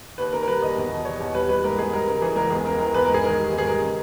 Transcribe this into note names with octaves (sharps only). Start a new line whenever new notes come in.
D#2 B4
D#3 A#4
A#4
G3 B4
D#2 D#5
E2
B2
G3 C#5
E2
G3 B4
G3 B4
G#2 A#4
G#2 G#4
G3 A#4
C#3 A#4
E3 G#4
C#2 A#4
E2 G#4
C#3 A#4
E3 A#4
E2 B4
G#2 A#4
G#4
D#3 A#4
G3
G#2
G#4
G3 A#4
C#3